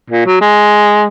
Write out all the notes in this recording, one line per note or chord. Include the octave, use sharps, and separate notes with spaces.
A#2
F#3
G#3